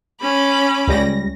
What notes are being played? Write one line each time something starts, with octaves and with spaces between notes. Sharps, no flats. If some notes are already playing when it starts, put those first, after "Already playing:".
C#4 B5 D6
C#2 G3 A#6